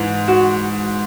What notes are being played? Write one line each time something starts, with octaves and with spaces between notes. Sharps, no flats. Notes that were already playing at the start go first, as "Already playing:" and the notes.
Already playing: G#2 E3
F#4